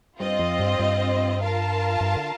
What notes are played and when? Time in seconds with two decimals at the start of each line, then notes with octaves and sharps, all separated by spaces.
0.19 G2 C4 F4 C5 D#5
0.39 F2
0.59 G2
0.80 G2
1.40 F4 A#4 F5 A5
2.01 G2
2.16 D3